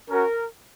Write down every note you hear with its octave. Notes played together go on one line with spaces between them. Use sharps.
C#4 F#4 A#4